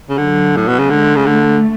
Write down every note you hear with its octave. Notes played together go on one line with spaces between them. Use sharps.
C#3
D3 F#3
A2
B2
C#3
D3 G#3
C#3
D3 A3